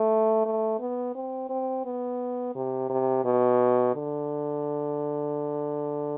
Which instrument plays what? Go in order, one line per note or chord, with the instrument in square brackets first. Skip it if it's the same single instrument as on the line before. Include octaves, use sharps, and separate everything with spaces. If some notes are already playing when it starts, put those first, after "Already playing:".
Already playing: [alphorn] A3
A3
B3
C4
C4
B3
C3
C3
B2
D3